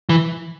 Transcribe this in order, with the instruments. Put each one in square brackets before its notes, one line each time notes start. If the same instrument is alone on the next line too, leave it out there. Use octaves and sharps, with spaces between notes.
[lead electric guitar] E3